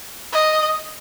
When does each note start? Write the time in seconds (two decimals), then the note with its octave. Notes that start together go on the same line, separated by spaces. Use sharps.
0.33 D#5